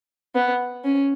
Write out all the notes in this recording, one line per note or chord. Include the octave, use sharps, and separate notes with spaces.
B3
C#4